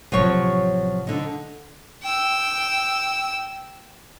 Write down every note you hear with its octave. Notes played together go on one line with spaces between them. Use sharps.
A1 C3 F3 F#3 C#5
D3 D#4
G5 E6